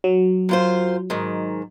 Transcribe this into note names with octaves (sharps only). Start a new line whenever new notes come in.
F#3
F#2 F4 C5
G#2 D#3